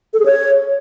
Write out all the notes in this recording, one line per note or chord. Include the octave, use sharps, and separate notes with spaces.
A4
G#4
C#5